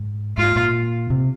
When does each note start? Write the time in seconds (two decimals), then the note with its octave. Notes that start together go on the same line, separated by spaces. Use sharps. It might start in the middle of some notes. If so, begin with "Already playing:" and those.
Already playing: G#2
0.38 G#2 F4
0.56 A#2
1.10 C3